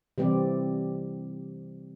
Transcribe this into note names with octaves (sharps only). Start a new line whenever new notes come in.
C3 E3 G3 C4 G4 D5